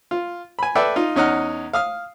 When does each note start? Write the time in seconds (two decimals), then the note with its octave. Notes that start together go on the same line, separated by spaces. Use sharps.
0.11 F4
0.59 G#5 B5
0.75 A4 B4 D5 E5 G5
0.96 D#4 F4
1.16 E2 C#4 D#4 D#5 F#5 F6
1.73 F5 D#6 F6